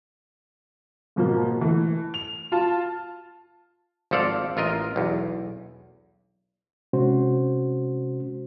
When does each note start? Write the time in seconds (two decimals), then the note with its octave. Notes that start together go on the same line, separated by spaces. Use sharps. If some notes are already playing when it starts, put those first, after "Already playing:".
1.16 G#2 B2 F3 A#3
1.61 E3 A3
2.14 F7
2.52 F4 A5
4.11 G#1 F3 A4 D5 F5
4.57 A1 F4 A#4 D#5
4.96 B1 E2
6.93 C3 G#3 C#4 F#4 C5